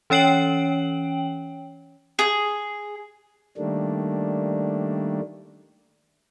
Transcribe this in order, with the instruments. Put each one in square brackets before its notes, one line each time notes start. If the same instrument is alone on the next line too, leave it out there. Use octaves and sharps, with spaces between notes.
[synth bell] E3 C#4 C#5 G5 D7 F#7
[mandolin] G#4
[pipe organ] D#3 G3 A3 A#3 D4